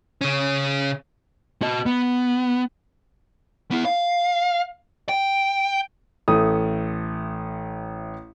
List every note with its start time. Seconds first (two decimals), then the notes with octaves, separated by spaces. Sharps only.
0.21 C#3 C#4
1.62 F#4 D#5
1.86 B3
3.71 B3 E4
3.85 F5
5.09 G5
6.28 A1 A3 D#6